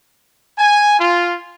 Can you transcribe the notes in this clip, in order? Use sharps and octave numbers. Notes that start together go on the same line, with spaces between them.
G#5
F4